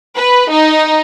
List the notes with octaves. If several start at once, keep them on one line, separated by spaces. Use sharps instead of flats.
B4
D#4